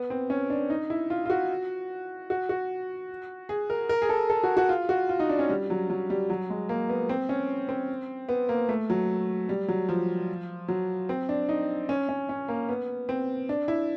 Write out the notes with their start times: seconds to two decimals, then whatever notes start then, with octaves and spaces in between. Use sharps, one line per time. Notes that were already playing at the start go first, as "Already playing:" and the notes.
Already playing: B3
0.10 C4
0.30 C#4
0.50 D4
0.70 D#4
0.90 E4
1.10 F4
1.26 F4
1.30 F#4
2.30 F#4
2.49 F#4
3.49 G#4
3.70 A#4
3.89 A#4
4.02 G#4
4.09 A4
4.30 A4
4.44 F#4
4.57 F#4
4.69 F4
4.89 F#4
5.09 F4
5.19 D#4
5.29 D4
5.39 C#4
5.49 G3
5.70 F#3
5.90 F#3
6.10 G3
6.30 F#3
6.50 G#3
6.69 A#3
6.89 B3
7.09 C4
7.29 C#4
7.69 C4
8.29 B3
8.49 A#3
8.69 A3
8.90 F#3
9.49 G3
9.68 F#3
9.89 F3
10.68 F#3
11.09 C4
11.29 D4
11.49 D#4
11.89 C#4
12.09 C#4
12.29 C#4
12.48 A#3
12.69 B3
13.09 C4
13.49 D4
13.68 E4